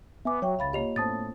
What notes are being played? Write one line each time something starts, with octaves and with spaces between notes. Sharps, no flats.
B3 E5 G#5 D6
F#3 C#5 E5 G5 C#6
C#2 F5 B5 A6
A#3 F4 G4 C#5 D#5 F7
A2 B3 C#4 C5 A5 D#6 A6